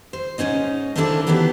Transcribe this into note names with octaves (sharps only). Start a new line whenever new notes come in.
C5
G#2 D#3 C#4 D#4 D#5
A3 A#3 C4 D4 E4 A4
E3 F#3 B3 G4 E5